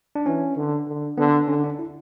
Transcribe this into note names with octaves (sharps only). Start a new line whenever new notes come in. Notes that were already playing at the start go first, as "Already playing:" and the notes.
D4
E3 C#4
D3
D3
D3 B3
D3 C#4
D4
E4